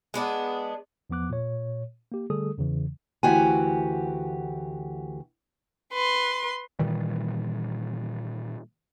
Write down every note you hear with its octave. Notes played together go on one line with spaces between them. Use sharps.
G#3 B3 D4
E2 F3 B3 D6 F#6
A#2 C#5
A#3 G4
D3 G3 A3 G#4 A4 D#6
E2 C#3 E3
D2 E3 F#4 G4 G#5
B4 C6
A#2 D#3 E3 G3